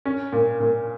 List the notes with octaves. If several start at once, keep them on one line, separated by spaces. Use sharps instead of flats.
C#4
A#2
A#2